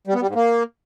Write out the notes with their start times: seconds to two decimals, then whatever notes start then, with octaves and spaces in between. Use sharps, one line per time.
0.07 G3
0.14 B3
0.21 G3
0.28 G#2
0.35 A#3